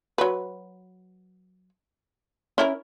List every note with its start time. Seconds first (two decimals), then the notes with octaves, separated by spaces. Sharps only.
0.18 F#3 B4
2.58 C#4 E4 A#4